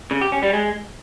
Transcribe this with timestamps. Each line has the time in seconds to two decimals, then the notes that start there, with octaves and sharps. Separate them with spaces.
0.11 C#3
0.21 G4
0.32 C#4
0.43 G3
0.53 G#3